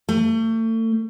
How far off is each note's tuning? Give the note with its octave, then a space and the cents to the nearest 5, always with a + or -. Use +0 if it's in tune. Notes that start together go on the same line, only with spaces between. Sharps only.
A3 +35